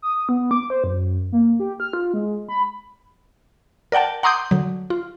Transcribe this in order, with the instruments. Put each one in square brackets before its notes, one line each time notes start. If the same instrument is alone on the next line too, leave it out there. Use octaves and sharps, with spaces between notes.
[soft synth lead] D#6
B3
D6
C5
F#2
A#3
G4
F6
F4
G#3
B5
[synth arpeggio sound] A#4 D5 F#5 G5 A5
F#5 A#5 C6 D6 D#6 G6
D3 F#3
F4